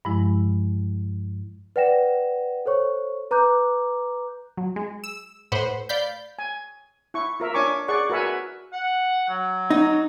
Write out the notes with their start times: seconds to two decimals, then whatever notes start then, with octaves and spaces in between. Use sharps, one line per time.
0.05 G2 F3 G#3 E4
1.76 B4 D5 F#5 G5 A#6 E7
2.66 A4 C5 C#5 C#6
3.31 B4 A#5 D6 F#6 G6
4.57 F#3
4.76 G#3
5.04 E6
5.52 A2 B4 C5 F#5
5.89 D5 F5 B5 G6
6.39 G#5
7.14 E4 C#6
7.40 F4 A#4 E5
7.54 D4 C#5 G#5 C#6 D6
7.88 G#4 D5 F#5 C#6
8.10 F#4 A#4 B4 E5 F#5 G#5
8.73 F#5
9.29 F#3
9.70 D#4